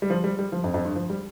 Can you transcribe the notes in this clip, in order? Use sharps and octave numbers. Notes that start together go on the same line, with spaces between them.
G3
F3
G3
G3
F3
F2
F2
G2
F3
G3